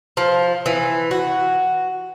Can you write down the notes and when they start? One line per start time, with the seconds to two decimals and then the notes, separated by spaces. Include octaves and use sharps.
0.17 F3
0.66 E3
1.11 F#4